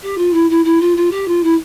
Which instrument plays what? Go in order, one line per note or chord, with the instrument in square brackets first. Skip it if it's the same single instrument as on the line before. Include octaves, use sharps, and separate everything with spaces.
[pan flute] G4
F4
E4
E4
E4
F4
F4
G4
F4
E4